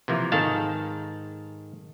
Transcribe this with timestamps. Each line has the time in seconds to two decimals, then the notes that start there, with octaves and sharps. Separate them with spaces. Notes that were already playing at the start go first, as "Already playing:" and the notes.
0.08 C3 E3 F3 A#3
0.32 G#2 D#3 A4 F5 A5